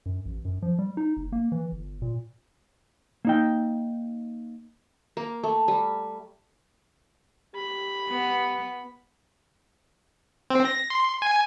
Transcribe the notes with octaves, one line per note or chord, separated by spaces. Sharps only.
F#2
A1
F#2
F3
G3
D#4
F#1
A#3
E3
G1
A#2
A#3 D#4 G5
A#3
A3
G3
G4 B5
B3
C4
A#6
C6
G#5